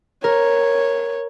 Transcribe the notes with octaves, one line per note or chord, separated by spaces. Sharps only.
A#4 C#5